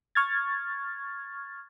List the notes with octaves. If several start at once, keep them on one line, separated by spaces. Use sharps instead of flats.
C#6 F6 G#6 A6